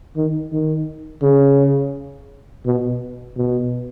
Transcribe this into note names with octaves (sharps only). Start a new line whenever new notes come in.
D#3
D#3
C#3
B2
B2